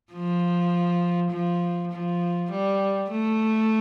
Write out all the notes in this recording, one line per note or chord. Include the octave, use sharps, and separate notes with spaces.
F3
F3
F3
G3
A3